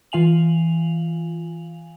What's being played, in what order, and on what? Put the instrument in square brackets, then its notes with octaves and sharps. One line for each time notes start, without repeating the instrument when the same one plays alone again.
[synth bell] E3 F4 F5 G#5 F7 F#7